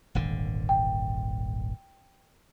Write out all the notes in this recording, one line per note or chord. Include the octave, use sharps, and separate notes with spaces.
D#1 G#1 D3
G5